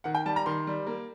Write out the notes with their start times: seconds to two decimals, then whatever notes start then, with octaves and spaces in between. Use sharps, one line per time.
0.04 D#3 F#5
0.15 G5
0.26 G3 A5
0.36 A#5
0.46 D#3 C6
0.67 G3
0.87 A#3